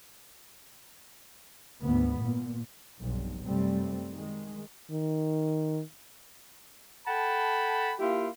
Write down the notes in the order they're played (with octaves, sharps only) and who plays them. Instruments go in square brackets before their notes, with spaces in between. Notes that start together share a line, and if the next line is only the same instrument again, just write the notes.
[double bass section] G#1 D2 B3
A#2
F1 B1 G2
F#2 C3 G3 A3 C4
D#3 G#3
[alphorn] D#3
[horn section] A4 F#5 G5 A5 B5
A#3 E4 F4 G4